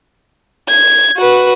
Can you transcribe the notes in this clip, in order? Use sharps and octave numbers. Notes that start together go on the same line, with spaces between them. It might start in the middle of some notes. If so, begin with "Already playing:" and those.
G#6
F#4 B4